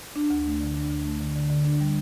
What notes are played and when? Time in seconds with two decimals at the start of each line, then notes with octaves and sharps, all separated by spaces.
0.16 D4
0.30 D2
0.46 A3
0.60 D3
0.76 D4
0.90 D2
1.05 A3
1.21 D3
1.36 D3
1.50 D3
1.65 D4
1.80 G3